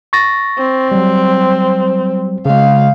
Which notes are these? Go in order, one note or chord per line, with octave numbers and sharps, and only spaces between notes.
C#6 A6 A#6
C4
F#3 G3
C#3 G#3 F5